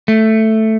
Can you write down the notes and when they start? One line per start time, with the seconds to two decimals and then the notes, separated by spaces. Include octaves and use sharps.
0.08 A3